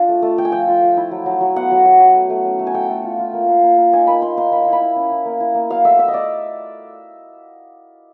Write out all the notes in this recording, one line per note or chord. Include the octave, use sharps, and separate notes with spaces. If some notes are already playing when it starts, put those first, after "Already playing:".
Already playing: D4 F4
A3
A3
A3 G5
G#5
F3 G5
F4
F3
E4
F#3
F#3
F#3
B3 F#5
F#3
F#3
F#3
A3
A3
C#4
A3
G#5
A3 G5
A3
F4
F4
A#3
A#3
A#3
A#3
D#4 G#5
A#3 B5
A#3 C6
D#4 C6
A#3 B5
E4 C6
B5
E4
C#4
E4
A#3
E4
A#3
F#3 F5
A3 E5
A3 E5
D#5
D5